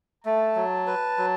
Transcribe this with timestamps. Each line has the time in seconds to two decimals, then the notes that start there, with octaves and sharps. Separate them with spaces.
0.24 A3 A5
0.56 F#3
0.87 B4
1.18 F#3